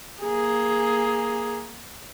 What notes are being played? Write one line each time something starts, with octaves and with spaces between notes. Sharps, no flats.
A#3 G#4